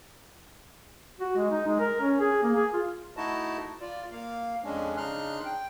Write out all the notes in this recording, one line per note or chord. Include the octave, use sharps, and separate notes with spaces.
F#4
G#3
D#4
G#3
A#4
C#4
G#4
A#3
G#4
F4
A3 D#4 E4 F#4 D#5 A5
F4 D5
A#3 F5
F2 G#3 C#4 D4
C#3 D4 D#4 C6 F6 F#6
G5